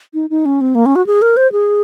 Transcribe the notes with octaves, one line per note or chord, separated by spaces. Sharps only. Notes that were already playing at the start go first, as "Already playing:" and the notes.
D#4
D#4
C#4
C4
A#3
C#4
F#4
G#4
A#4
C5
G#4